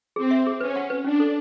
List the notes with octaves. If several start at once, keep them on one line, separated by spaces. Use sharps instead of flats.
C4 G#4
E5
G#4
C#4 B4
F#5
B4
C#4 D4
A4